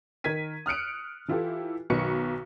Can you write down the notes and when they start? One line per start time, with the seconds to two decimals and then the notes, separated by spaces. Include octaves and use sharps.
0.24 D#3 A#4 G#6 B6 D#7
0.66 D#6 F6 F#6 C#7 D7
1.28 E3 E4 F4 G4 A4
1.90 B1 D#3 F#3 B4 C#6 C#7